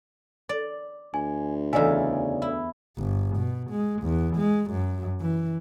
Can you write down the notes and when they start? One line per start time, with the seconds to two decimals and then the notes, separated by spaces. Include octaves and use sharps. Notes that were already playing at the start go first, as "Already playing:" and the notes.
0.49 D5
1.14 D2 G#5
1.73 E2 C#3 D#4 D5 E5 G#5
2.42 E4
2.97 G1
3.37 B2
3.71 G#3
4.03 E2
4.37 G#3
4.71 F#2
5.21 E3